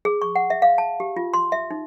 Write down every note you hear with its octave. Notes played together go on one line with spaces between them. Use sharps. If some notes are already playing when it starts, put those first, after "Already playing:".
G#4
C#6
F#5
E5
F5
A5
G4
F4
C6
E5
D#4